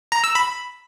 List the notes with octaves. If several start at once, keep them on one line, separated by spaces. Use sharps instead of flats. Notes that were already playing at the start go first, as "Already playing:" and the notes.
A#5
E6
B5